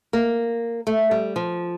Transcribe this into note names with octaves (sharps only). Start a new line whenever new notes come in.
A#3
A3
G3
F3